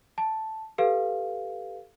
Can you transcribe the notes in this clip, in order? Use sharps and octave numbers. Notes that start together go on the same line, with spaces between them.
A5
G4 A4 B4 F5